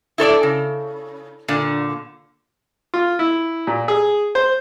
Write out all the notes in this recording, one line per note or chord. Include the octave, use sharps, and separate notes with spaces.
E4 A4 C#5 D5
C#3
A#2 D3
F4
E4
A#2
G#4
C5